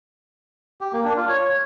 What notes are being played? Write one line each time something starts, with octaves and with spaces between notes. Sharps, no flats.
G4
A#3
D4
F4
C#5